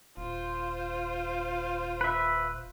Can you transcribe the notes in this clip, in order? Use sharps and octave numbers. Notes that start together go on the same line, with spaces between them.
D#1 F4 C5
B4 E5